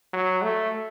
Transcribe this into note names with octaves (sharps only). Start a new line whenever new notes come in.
F#3
A3